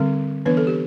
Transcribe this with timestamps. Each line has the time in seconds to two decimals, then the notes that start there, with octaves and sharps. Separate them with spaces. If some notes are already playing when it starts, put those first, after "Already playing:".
Already playing: D3 G3 C4 A4
0.46 E3 B3 D4 B4
0.57 A4
0.67 G4